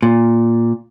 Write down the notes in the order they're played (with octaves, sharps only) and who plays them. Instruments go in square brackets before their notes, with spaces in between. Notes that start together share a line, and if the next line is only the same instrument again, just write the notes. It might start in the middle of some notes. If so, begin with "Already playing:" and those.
[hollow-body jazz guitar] A#2